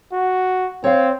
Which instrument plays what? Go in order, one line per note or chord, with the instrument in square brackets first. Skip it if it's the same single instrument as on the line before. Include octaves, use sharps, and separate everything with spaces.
[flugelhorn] F#4
[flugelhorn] C4 [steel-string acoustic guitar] C#5 F5